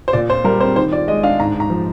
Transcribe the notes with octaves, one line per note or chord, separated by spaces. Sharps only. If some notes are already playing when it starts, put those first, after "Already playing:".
C5
A#2 D5
F4 C5
G3 A#4
C4 C5
D#3 C5
F4 D5
G#3 D#5
D4 F5
G#2 A#5
G#2
A#5
F3